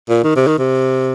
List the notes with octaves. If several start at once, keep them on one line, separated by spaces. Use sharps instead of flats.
A#2
D#3
C3
D#3
C3